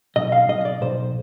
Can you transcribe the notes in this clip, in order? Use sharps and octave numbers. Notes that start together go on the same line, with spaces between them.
B1 D#5
F5
B1 D#5
D#5
D5
B1 C5